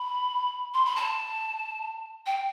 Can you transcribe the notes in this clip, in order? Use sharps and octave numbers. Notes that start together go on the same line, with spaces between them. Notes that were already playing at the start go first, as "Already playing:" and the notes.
Already playing: B5
C6
B5
A5
G5